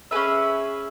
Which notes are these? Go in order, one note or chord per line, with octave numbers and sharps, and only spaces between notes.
C#4 G#4 B4 E5